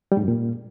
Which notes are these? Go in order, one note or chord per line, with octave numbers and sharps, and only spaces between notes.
G3
G#2
F#2
A#2